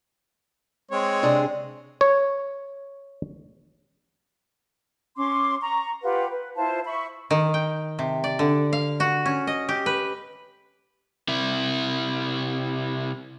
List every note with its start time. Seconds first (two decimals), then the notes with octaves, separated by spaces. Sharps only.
0.91 G#3 C4 C#5
1.23 C3 D4 G#4
2.01 C#5
5.17 C#4 C6 D6
5.61 A#5 C#6
6.03 F4 G4 B4 F#5
6.31 B4
6.55 E4 F4 C5 A5
6.86 E5 B5 C#6
7.31 D#3
7.54 G5
7.99 C3
8.24 D5
8.39 D3
8.73 F5
9.00 F#4
9.25 C#4
9.47 D#5
9.69 G4
9.86 B4
11.28 C3 E4